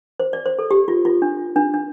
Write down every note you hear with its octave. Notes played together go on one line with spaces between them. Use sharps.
C5
D5
C5
A4
G4
F4
F4
D4
D4
D4